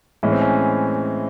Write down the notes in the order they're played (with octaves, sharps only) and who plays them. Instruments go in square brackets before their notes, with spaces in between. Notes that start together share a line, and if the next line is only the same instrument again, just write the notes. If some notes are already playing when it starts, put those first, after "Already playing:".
[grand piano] A2 E3 G#3 C#4
C4
C#4